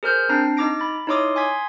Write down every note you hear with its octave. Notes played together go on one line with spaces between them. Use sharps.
G#4 A#4 C5 F6 G6
C4 D4 A#5 A#6 C7
D#4 A#5 D6 A#6 D7
B5 A6
D#4 E4 C#5 C6 D6 D#6
G#5 C6 D#6 G#6 B6